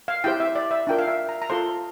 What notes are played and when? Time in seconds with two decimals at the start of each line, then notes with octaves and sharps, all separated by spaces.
0.08 F5
0.24 E4 G4 C5 G5
0.40 E5
0.55 D5
0.71 E5
0.87 D4 F4 A#4 G5
0.99 F5
1.08 E5
1.29 A#5
1.42 A#5
1.50 F4 A4 C5 C6